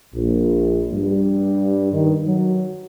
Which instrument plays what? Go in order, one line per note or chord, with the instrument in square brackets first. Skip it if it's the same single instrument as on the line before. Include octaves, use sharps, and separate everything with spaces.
[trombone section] A#1
G2
D#3
F#3